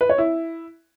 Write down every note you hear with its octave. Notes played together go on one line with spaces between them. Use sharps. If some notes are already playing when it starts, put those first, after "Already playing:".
B4
C#5
E4